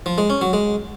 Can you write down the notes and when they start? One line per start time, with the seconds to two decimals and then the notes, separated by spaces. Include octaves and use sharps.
0.06 F3
0.18 G#3
0.30 C#4
0.41 F#3
0.53 G#3